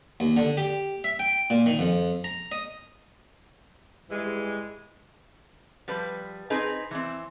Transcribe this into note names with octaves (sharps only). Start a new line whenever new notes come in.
D#2
D3
G4
E5
G5
A#2
D#3
F2
A#5
D#5
G#2 E3 G3 G#3
F3 G3 B4
C4 D#4 G#4 B4
E3 C4